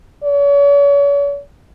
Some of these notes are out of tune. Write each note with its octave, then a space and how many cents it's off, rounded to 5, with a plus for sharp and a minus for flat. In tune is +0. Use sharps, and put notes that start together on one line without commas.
C#5 +40